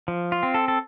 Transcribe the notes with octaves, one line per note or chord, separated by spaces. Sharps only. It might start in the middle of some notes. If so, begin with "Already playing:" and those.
F3
F4
C4
A4
A4